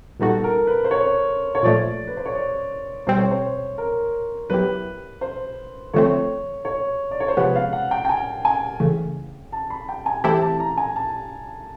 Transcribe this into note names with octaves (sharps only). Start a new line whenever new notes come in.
A#2 G3 B3 D#4 F#4 A4
A#4
B4
C5
C#5
C#5
A#2 F3 A3 D5
B4
C5
C#5
D5
B2 G3 C4 C5
C#5
C5
A#4
F#3 B3 E4 G4 B4
C5
D3 F3 A3 C4 C#5
C#5
D5
C#5
C5
C3 F3 G#3 B3 B4
F5
F#5
G5
G5
G#5
G#5
C#3 E3 A3
A5
B5
G5
G#5
E3 A3 C4 E4 G4 A5
A5
A#5
G#5
A5